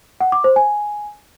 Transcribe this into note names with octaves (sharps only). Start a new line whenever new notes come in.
F#5
D6
C5
G#5